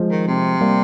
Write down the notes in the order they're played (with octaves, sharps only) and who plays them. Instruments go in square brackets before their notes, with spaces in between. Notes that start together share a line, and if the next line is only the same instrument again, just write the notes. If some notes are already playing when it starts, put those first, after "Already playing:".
Already playing: [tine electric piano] F3 G#3
[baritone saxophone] D#3
C3
[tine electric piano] G3 A#3